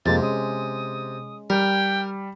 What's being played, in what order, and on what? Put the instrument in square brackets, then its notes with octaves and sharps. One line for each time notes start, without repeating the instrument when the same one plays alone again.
[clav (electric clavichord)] F2 G#3 A#3 [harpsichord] C3 [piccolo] A6
[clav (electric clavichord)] G#3 C#4 [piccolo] D#6
[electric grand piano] G3 [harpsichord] A#4 [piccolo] G5